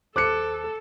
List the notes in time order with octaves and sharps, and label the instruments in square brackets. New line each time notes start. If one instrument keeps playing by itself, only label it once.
[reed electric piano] D#2 C5 F#6 [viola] A4 [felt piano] D6 C#7